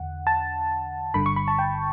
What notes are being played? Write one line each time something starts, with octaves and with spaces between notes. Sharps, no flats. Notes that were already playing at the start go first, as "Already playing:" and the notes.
Already playing: E2 D3 F#5
A5
G1 G2 D3 B5
C#6
B5
A5
G5